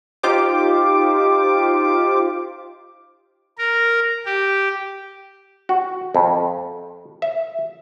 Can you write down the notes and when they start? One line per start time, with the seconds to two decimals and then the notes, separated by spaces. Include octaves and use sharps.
0.23 D#4 F4 G4 C5 D6
3.58 A#4
4.25 G4
5.69 F#4
6.15 F2
7.22 E5